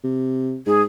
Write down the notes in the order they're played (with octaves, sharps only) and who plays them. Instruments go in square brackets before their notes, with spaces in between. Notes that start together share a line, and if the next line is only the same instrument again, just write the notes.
[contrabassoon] C3
[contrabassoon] G#2 [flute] G#4